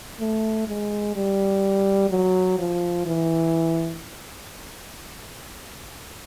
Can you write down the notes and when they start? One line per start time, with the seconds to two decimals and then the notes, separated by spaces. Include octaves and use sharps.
0.20 A3
0.68 G#3
1.16 G3
2.10 F#3
2.59 F3
3.06 E3